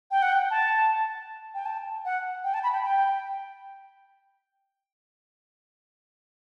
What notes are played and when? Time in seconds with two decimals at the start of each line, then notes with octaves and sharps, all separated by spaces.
0.11 G5
0.22 F#5
0.32 G5
0.50 A5
1.54 G5
1.66 A5
2.05 F#5
2.44 G5
2.54 A5
2.63 B5
2.72 G5
2.83 G5